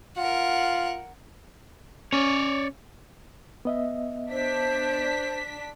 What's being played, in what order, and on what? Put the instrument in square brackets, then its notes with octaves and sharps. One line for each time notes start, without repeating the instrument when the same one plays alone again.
[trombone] F4 [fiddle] A#4 F#5
[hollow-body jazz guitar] C#4 [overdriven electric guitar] C#5 D5
[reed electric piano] B3 D#5 E5
[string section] D4 B6 [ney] C5